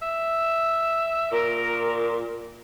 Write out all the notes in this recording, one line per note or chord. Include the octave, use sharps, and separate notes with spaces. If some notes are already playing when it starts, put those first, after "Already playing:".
E5
A#2 A#4